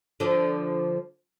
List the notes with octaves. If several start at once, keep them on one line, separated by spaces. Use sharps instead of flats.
D3 F3